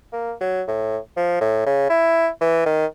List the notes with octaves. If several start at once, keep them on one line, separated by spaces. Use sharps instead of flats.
A#3
F#3
A2
F3
A2
C#3
E4
E3
D#3